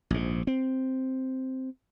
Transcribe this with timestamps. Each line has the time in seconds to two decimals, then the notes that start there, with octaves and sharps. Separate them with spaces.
0.11 A#1 G#2
0.47 C4